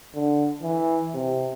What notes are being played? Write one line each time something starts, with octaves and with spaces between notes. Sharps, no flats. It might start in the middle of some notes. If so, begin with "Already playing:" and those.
D3
E3
C3